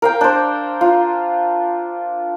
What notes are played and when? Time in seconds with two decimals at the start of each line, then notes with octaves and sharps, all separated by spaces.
0.02 A#4 F5 G5
0.21 D4 C5
0.81 F4